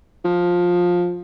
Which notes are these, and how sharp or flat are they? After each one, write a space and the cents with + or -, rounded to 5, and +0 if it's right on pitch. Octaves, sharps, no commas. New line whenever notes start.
F3 +15